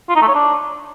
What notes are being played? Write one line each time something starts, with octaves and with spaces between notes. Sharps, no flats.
F4
D#4
A3
C#5
D4